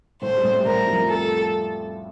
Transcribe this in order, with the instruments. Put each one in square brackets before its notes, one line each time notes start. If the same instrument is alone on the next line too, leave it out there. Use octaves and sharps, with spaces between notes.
[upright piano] A2 A3 [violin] C5
[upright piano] G3
A2 A3
G3
[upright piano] A2 A3 [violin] A#4
[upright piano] F2 F3
[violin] A4